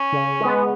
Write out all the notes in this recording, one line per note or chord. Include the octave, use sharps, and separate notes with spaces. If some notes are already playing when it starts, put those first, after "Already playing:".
Already playing: C#4
C#3
G#3 B3